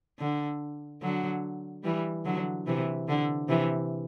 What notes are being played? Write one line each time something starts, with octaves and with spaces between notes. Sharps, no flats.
D3
D3 F#3
E3 G3
D3 F#3
C3 E3
D3
C3 E3